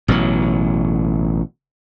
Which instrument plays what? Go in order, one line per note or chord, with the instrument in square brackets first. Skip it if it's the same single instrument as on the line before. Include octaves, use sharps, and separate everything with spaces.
[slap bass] A1 B2 D3 F#3